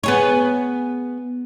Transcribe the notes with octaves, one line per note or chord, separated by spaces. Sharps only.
B3 G#4 C#5